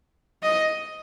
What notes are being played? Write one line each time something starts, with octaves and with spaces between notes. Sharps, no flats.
D#5